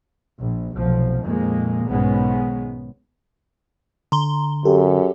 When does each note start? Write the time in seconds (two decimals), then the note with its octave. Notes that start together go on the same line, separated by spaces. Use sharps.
0.39 A#1
0.74 F1 B1 F3
1.24 F2 A#2 D#3 G#3 A#3
1.87 B1 G#2 D#3 G#3 B3 C#4
4.12 D3 A#5 C6 G7
4.65 F#2 G4 A4